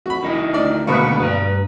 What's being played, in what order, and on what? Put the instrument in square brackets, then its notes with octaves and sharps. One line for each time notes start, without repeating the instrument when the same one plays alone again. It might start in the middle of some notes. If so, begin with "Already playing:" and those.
[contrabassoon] F2 [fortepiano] F#4 B5
[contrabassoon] F1 [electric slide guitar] D#3 D#4 E4
[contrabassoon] D2 [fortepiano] D4 D5 D#5
[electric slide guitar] G#2 D3 D#3 [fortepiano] B2 A#3 [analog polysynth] B3 B4 C#6
[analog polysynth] G2 [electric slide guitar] B4 A#5